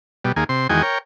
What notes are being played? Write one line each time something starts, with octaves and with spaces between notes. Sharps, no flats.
B2 G3
D#2 A#3 G#4
C3 C6
E2 D#3 G#3 F#4 G5 G#5
A#4 C#5 G5